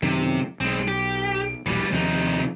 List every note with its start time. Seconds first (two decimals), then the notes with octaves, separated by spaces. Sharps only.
0.03 F#2 C3 D#3
0.61 B1 G#3 C4
0.88 G4
1.66 E1 A#1 E3 G3
1.93 D#2 C3 F3 D#4